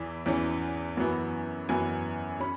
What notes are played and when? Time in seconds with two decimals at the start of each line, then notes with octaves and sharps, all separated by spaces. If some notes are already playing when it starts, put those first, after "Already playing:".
Already playing: E2 E3
0.26 E2 E3 C#4
0.97 F#2 E3 B3
1.69 F#2 E3 B3 G#5
2.40 C#4 B5